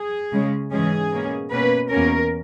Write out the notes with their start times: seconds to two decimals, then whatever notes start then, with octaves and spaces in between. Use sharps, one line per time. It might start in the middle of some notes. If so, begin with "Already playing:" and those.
Already playing: G#4
0.32 C#3 G#3 C#4
0.71 G#2 E3 G#3 C#4 G#4
1.11 B2 A#3 C#4
1.52 B2 A#3 C#4 B4
1.91 E2 B2 A#3 C#4 A#4